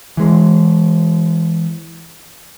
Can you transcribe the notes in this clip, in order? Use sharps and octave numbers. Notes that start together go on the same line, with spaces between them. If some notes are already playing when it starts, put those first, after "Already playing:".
E3 G#3